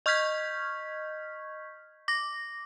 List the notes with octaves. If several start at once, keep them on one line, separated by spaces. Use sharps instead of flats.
D#5 C#6 F6 G6 G#6 B6
D6 A#6